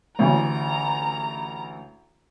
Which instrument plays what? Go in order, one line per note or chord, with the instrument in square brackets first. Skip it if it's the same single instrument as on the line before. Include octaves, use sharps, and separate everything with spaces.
[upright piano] A1 D2 [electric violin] A#5